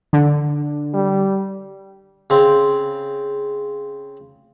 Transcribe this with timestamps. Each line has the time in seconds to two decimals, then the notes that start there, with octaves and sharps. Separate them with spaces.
0.13 D3
0.94 G3
2.30 C#3 C4